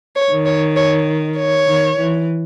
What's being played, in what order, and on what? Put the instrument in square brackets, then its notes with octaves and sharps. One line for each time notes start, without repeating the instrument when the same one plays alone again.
[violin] C#5
[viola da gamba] D#3
[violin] C#5
C#5
C#5
[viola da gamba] D#3
E3